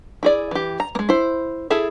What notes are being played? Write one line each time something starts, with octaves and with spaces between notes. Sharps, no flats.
E4 G#4 D5
E3 G4
A#5
G#3 A#3
E4 C5
E4 G#4 A4 E5